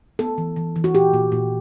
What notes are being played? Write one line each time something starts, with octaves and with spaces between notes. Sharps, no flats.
B3 A4
E3
E3
E3
F#4
A#2 G4
A#2
A#2